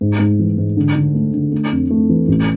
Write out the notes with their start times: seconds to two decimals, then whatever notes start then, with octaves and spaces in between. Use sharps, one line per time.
0.01 G#2
0.19 G#2
0.39 E3
0.58 G#2
0.77 D3
0.95 D3
1.14 A3
1.34 D3
1.52 A3
1.71 F2
1.91 A3
2.09 E3
2.28 A1